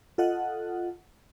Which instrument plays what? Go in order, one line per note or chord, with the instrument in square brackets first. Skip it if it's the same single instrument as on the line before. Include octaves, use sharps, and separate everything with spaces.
[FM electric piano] F4 A4 D#5 F#5